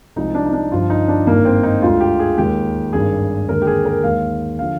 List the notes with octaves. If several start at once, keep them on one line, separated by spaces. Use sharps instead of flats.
C2 C3 F3 G#3 D#4
D4
D#4
D4
G1 G2 F3 F4
D#4
D4
G#1 G2 D#3 A#3
C4
D#4
D2 D3 G#3 F4
G4
G#4
D#2 D#3 G#3 G4
G#1 G2 D#3 G3 G#4
D#2 D3 G#3 A#4
G4
G#4
A#4
D#2 D#3 G#3 F5
D3 F3 F5